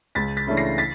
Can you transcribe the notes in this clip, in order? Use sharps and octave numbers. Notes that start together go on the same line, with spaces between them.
C#2 A6 B6
A6 B6
C#3 E3 A3 D4
A#6 C7
A6 B6